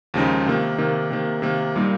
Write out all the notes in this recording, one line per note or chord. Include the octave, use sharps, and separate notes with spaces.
D#2 C#3 F3 G#3 D#4
C3 D#3 A#3
C3 D#3 A#3
C3 D#3 A#3
C3 D#3 A#3
A#2 G3 A#3 D#4